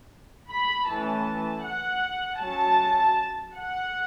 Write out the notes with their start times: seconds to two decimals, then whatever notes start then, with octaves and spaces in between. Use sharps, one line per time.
0.50 B5
0.88 E3 A3 C#4 A5
1.64 F#5
2.40 F#3 C#4 A5
3.55 F#5